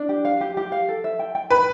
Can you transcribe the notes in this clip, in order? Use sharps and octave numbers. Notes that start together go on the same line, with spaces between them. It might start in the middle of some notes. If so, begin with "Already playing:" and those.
Already playing: D4
G4
F5
G4
G4
F5
A4
E5
G5
G5
B4 B5